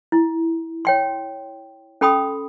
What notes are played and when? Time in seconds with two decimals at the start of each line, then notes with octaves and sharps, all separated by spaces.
0.12 E4
0.85 C#5 G5 C6
2.01 C#4 A4 G5 B5 C6 D#6